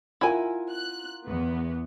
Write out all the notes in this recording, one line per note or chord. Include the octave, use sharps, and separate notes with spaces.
E4 F4 A#4 F#5 G#5
F#6
E2 B3